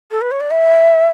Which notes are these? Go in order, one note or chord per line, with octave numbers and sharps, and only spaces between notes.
A4
B4
C#5
D5
E5